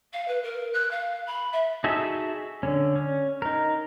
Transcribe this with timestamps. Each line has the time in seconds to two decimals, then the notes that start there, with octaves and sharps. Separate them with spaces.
0.13 F5
0.28 B4
0.43 A#4
0.73 F#6
0.91 F5
1.26 B5
1.52 E5
1.84 D#4 F#4 G#4 A4 E5
2.63 D3 C#4
2.95 C#4
3.42 D#4 A#4